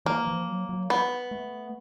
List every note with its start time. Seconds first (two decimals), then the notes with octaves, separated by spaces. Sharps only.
0.06 E3 A#3
0.27 F3
0.48 F#3
0.69 F#3
0.90 B3
1.31 A3